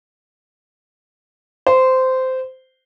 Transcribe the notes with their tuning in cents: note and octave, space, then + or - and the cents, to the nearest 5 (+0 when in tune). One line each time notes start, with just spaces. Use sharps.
C5 -15